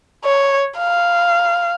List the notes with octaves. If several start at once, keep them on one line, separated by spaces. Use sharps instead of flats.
C#5
F5